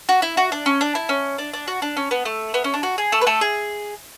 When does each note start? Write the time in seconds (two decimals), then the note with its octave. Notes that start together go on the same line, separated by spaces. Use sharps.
0.09 F#4
0.22 E4
0.37 F#4
0.52 D4
0.66 C#4
0.81 D4
0.95 E4
1.09 C#4
1.38 D4
1.53 D4
1.68 F#4
1.82 D4
1.97 C#4
2.11 B3
2.25 A3
2.54 B3
2.64 C#4
2.74 D4
2.83 F#4
2.98 G#4
3.12 A3 A4
3.21 B4
3.27 A3 A4
3.41 G#4